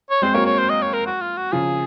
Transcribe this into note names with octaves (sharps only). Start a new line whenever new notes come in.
C#5
G#3 C4 C5
F#3 A#3 C#5
C#5
C5
D#5
C#5
A#4
F#4
F4
F#4
C#3 F3 G#4